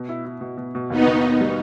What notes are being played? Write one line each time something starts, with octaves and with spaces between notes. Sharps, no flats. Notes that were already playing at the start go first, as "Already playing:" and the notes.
Already playing: B2
E4
E4
B2
B2
B2
D#2 B3 D#4
D#3
D#4
G3